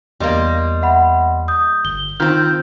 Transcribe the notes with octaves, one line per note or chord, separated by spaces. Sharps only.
E2 G3 A#3 D#5 C6
E5 F#5 B5
D#6 G6
G1 G7
D#3 C4 F4 F6 G6